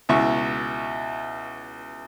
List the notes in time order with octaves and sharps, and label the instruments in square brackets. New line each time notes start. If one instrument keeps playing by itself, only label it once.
[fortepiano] C#2 B2 E4 C#6